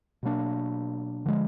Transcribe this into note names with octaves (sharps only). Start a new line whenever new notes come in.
B2 F#3 A#3 D4
D3 F3 G#3